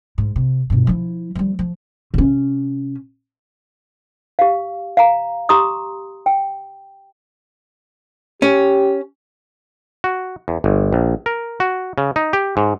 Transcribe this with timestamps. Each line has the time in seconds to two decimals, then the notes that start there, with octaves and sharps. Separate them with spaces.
0.18 G#2
0.36 C3
0.70 G2 B2
0.87 F3 E4
1.35 F3 G3
1.59 F3
2.14 C3 C#4
4.39 G4 F5
4.97 F5 A#5
5.49 G4 A#5 C6 D#6
6.26 G5
8.42 C#4 G4
10.04 F#4
10.48 E2
10.64 G1
10.93 A#1
11.26 A#4
11.60 F#4
11.98 C#3
12.16 D#4
12.33 G4
12.57 G#2